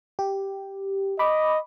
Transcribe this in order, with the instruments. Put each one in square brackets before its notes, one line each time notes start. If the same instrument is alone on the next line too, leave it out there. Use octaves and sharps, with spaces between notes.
[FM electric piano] G4
[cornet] D#5 [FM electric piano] B5 D6